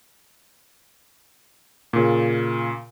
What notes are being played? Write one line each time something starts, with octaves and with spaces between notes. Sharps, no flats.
A#2 C#3